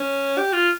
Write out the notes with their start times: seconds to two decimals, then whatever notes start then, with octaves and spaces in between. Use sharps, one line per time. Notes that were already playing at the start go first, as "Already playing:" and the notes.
Already playing: C#4
0.38 G4
0.53 F4